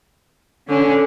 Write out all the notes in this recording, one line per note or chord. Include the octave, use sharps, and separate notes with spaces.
D3 C#4